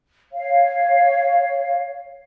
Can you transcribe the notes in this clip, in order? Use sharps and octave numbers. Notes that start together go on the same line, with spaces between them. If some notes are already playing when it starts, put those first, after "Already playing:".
C#5 F5